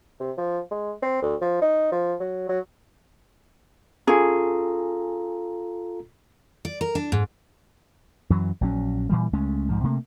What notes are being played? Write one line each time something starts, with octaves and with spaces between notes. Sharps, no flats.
C3
F3
G#3
C4
D2
F3
D#4
F3
F#3
F#3
C#4 F4 G#4 A4 A#5
D5
A#4
D4
G#2
F#2 E3 F#3
A#1 F#3 C#4
A#2 E3 G3
C#2 G#3 A3 C#4
C2 G#2 F3
C3 A3 A#3